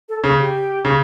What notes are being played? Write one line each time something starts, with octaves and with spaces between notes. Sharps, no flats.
A4
C#3 G#4
G4
C#3